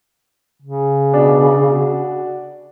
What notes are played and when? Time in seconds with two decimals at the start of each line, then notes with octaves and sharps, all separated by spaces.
0.62 C#3
1.14 B2 D4
1.70 F#4